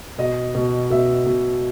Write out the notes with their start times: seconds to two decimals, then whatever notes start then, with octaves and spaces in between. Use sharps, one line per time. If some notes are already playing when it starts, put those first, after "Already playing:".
0.18 B2 D#5
0.55 B2
0.90 B2 E5
1.26 B2